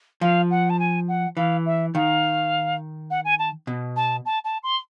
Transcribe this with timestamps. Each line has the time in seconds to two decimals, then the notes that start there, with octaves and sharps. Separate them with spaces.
0.21 F3 F5
0.50 F#5
0.70 A5
0.79 G#5
1.08 F#5
1.37 E3 F5
1.65 E5
1.94 D#3 F5
3.10 F#5
3.24 G#5
3.39 A5
3.67 B2
3.96 A5
4.25 A5
4.44 A5
4.63 C6